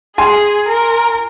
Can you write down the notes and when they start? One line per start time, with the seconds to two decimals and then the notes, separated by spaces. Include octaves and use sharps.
0.18 G#4 G#5 C6
0.68 A#4